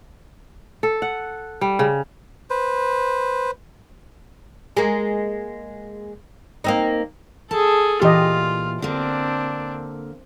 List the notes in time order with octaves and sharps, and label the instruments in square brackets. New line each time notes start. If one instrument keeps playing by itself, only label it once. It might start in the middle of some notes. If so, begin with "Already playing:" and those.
[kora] A4
F#5
G3
C#3
[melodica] B4 C5
[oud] G#3 A#3
A#3 C4 D#4
[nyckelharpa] G#4 A4 [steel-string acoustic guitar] A5
[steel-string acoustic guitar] A#2 E3 [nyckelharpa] F4 [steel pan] G4 D#5
[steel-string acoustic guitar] D3 A#3 [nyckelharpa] C4 D4